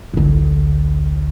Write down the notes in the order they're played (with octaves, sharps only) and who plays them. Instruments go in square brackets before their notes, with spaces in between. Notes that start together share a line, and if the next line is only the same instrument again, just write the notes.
[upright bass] A1 D2